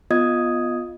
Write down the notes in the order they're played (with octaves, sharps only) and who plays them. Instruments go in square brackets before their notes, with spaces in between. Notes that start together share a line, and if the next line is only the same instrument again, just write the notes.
[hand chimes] B3 F4 D#5 D#6 G#6